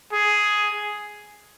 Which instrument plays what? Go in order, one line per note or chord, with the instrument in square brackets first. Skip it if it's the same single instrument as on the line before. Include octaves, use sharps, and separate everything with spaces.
[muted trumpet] G#4